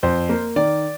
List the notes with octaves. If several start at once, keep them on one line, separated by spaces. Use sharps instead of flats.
F2 C5
A#3
D#3 D5